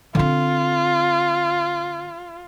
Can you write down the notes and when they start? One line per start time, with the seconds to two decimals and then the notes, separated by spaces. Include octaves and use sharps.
0.15 D3 C4 F4